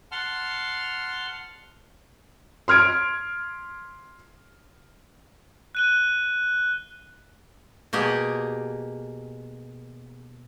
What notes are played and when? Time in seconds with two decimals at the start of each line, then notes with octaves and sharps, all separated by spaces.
0.12 F#5 A5 C6 F6
2.68 C6 F6 G#6 D7
5.75 F#6 D#7 G7
7.93 B2 A#3 G4 G#4